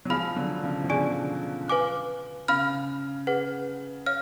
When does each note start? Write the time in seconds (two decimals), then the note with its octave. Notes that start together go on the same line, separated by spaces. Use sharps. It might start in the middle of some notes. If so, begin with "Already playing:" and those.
0.05 F#3
0.10 F3 G#3 F5 B5 F6
0.36 D3 F#3
0.63 C#3 F3
0.84 F3
0.89 B2 D3 G#4 D5 G#5 C#6
1.68 B4 F5 G#5 D6 F#6
2.48 C#3 F5 B5 F6
3.27 G#4 B4 F#5
4.06 C#5 F5 F6